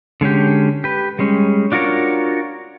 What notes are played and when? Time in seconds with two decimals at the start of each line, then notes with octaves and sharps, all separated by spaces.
0.21 D3 G#3 C#4 G4
0.84 G4 B4
1.19 G3 G#3 C#4
1.72 D4 F4 F#4 A#4 C#5